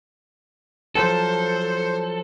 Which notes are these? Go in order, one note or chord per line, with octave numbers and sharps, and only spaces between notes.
F3 F#3 A4 C5